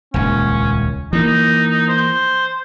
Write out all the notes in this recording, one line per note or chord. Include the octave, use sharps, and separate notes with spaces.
D#1 C#2 C#4
E3 A#3 D#4
C5